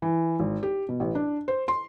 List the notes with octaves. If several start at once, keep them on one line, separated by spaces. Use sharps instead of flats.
E3
G#1
G4
B2
A1
D4
C5
C6